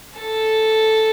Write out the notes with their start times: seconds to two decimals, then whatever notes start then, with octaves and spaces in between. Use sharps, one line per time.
0.19 A4